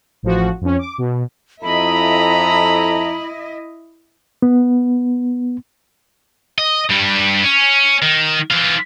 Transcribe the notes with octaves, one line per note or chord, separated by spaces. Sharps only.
A1 F3 F#4
F2 C#4
D6
B2
F2 E4 A4 D#5 A#5 B5
B3
D#5
G2 G3
C#4
D#3
E3 F4